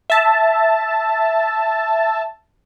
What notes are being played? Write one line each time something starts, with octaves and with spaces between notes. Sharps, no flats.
E5 A5